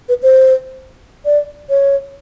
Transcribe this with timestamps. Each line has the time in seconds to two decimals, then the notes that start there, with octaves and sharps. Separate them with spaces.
0.09 B4
0.23 C5
1.25 D5
1.69 C#5